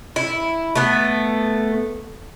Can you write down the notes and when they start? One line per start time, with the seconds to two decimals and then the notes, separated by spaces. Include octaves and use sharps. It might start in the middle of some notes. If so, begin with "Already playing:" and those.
0.16 E4
0.75 A3 B3